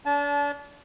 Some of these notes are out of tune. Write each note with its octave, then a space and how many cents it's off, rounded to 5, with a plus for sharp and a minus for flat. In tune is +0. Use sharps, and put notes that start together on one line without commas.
D4 -40 A5 -30